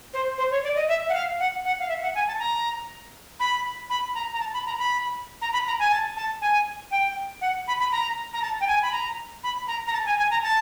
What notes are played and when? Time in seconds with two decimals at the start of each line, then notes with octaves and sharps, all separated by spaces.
0.14 C5
0.38 C5
0.51 C#5
0.63 D5
0.76 D#5
0.88 E5
1.09 F#5
1.14 F5
1.40 F#5
1.65 F#5
1.79 F5
1.89 E5
2.02 F#5
2.15 G#5
2.27 A5
2.39 A#5
3.40 B5
3.90 B5
4.15 A#5
4.33 A#5
4.40 A5
4.54 B5
4.66 A#5
4.79 B5
5.42 A#5
5.53 B5
5.67 A#5
5.79 G#5
5.91 A5
6.17 A5
6.41 G#5
6.91 G5
7.41 F#5
7.68 B5
7.80 B5
7.92 A#5
8.33 A#5
8.42 A5
8.61 G5
8.67 G#5
8.82 B5
8.92 A#5
9.43 B5
9.68 A#5
9.87 A#5
9.93 A5
10.06 G#5
10.18 G#5
10.31 A#5
10.43 A5